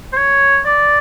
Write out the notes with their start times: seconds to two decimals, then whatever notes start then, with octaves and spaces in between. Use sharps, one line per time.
0.13 C5
0.17 C#5
0.65 D5